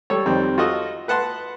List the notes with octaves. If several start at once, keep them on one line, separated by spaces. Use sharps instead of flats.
G3 A4 C#5
F2 D#3 G3 C4
F4 F#4 A4 D#5
B4 F#5 A5 C6